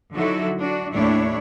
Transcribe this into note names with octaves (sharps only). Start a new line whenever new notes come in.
D3 F#3 D#4 E4 F#4 A4
D4 F#4
D#2 A2 D4 E4 C#5